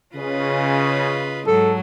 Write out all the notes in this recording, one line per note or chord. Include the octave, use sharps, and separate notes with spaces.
C#3 F4 B4 D#5
G#2 F#3 A4